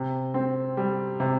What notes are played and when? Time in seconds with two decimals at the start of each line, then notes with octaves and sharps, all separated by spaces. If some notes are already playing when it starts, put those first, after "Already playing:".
Already playing: C3
0.34 C4
0.77 G3
1.20 C3